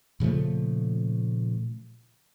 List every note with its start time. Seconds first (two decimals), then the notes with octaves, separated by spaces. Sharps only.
0.20 A#2 C#3 F3 A3